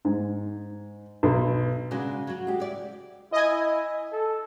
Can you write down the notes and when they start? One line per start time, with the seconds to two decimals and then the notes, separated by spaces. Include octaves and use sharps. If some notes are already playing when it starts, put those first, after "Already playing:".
0.05 G#2
1.23 B1
1.91 C#3 G#3 D4 F#4
2.27 F#3 F#4
2.47 G#3 G4
2.60 E4 D5
3.33 E4 D#5 G#5
4.12 A4